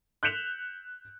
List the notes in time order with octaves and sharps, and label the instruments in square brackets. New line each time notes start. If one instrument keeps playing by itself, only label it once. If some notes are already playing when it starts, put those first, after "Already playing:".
[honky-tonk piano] F#6 G6 B6 C#7 E7 F7